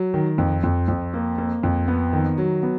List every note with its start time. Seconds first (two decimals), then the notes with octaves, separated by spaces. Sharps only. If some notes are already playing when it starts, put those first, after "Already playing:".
Already playing: F#3
0.14 D#3
0.38 F2
0.63 F2
0.88 F2
1.14 A#3
1.38 A#3
1.63 F2
1.88 B3
2.13 D#3
2.38 F#3
2.63 B3